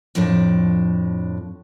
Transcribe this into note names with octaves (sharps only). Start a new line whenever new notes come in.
F2 A2 F3 D4